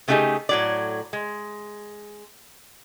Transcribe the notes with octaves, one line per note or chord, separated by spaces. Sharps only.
C#3 A3 D#4 F4 G4 G#4
A2 F#3 D5
G#3